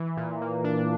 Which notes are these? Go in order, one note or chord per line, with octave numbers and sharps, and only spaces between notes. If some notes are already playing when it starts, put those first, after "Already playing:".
Already playing: E3
A#2
A#3
D4